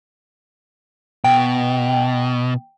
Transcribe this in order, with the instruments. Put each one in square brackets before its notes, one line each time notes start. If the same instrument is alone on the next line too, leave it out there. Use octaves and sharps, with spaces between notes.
[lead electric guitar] B2 [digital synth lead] G5